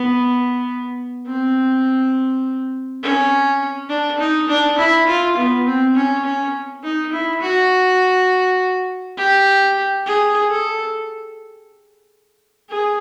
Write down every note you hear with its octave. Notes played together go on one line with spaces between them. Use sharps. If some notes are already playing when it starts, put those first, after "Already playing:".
Already playing: B3
C4
C#4
D4
D#4
D4
E4
F4
B3
C4
C#4
C#4
D#4
E4
F#4
G4
G#4
A4
G#4